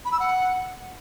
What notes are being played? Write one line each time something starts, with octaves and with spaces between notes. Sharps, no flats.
B5
E6
F#5